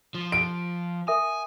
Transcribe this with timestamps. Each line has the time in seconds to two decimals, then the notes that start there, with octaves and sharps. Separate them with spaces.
0.15 F3
0.32 D7
1.08 A#4 E5 G#5 D#6